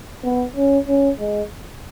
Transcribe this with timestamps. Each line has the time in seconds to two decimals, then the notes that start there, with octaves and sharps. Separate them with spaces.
0.24 B3
0.56 C#4
0.88 C#4
1.19 G#3